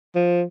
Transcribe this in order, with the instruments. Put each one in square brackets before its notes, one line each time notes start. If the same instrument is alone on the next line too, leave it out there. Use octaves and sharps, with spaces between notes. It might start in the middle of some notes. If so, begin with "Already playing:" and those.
[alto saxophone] F3